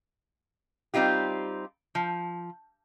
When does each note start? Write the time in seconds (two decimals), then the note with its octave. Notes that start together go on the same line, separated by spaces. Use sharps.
0.94 G3 C4 D#4 F4 G4
1.95 F3